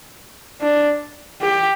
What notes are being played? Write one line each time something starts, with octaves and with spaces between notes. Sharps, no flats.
D4
G4